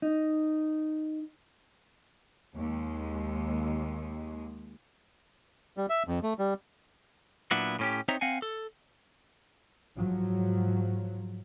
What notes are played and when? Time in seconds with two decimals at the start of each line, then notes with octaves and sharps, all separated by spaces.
0.02 D#4
2.55 D#2 G#3
5.77 G3
5.90 E5
6.08 F2
6.23 A3
6.39 G3
7.51 A#2 F#3 B3 D4 E4
7.79 A2 C#4 G4
8.08 C4 D#4 C5 C#5 E5 A#5
8.21 C4 F5 F#5 G#5
8.42 A4
9.96 G#2 F3 F#3